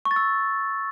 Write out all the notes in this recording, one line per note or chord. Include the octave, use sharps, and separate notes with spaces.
C#6
A6
E6